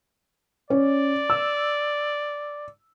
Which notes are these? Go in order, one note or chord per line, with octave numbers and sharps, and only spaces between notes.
C#4 D5
E6